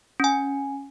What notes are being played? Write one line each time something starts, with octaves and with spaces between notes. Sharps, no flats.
C#4 G#5